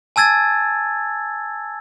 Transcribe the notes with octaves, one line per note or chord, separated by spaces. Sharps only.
G#5 A5 E6 G#6 A6